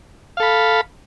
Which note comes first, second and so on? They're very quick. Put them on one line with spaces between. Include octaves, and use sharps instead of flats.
F5 A4 B5